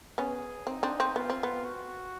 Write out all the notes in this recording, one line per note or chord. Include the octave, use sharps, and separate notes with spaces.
B3 C#4 G#4
C4 D#4
C4 D4
C4
B3 F4
C4
B3
F#4